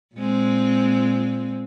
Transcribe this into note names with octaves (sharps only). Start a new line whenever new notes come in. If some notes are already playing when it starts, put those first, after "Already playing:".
A#2 G#3 C4